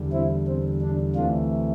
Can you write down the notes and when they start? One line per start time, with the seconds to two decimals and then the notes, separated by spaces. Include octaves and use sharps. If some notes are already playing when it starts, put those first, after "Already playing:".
Already playing: E2 D3 G3
0.12 C4 E4
0.47 C4
0.81 D4
1.15 D2 C3 E3 A3 D4 F4